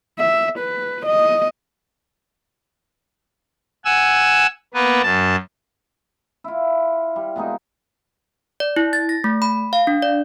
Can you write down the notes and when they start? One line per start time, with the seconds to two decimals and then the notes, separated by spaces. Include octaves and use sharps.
0.19 E5
0.59 B4
1.06 D#5
3.85 F#5 G#5 E6
4.74 A#3 B3 B4
5.03 F#2 A5
6.44 E4 F4
7.16 G3
7.36 B2 G#3 A#3 D#4
8.60 D5
8.76 E4
8.93 A6
9.09 A#6
9.24 A3
9.42 B5
9.73 F5
9.87 D4
10.02 D5